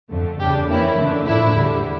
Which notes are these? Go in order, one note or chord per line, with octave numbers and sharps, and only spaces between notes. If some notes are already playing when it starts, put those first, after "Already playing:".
F2 D3 A3
E2 C#3 G3 D4 G4
F2 E3 A#3 C#4 E4
F2 D3 A3 D4
A2 F3 A3 D4 E4
E2 D3 G3